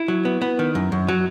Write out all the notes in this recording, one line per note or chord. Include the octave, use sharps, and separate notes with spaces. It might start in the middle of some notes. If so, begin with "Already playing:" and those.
Already playing: E4
F#3
B3
B3
D#3
F#2
F#2
F#3